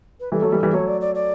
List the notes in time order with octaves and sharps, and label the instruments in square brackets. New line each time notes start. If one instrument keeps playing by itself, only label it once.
[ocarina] B4
[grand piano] E3 G3 [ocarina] A4
[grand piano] F#3 A3
E3 G3
E3 G3
[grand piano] F#3 A3 [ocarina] C#5
[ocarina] D5
D5
D5